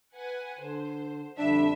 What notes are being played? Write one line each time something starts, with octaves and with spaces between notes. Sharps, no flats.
B4 F#5 G#5
D3 C5
F2 D3 G3 D4 E5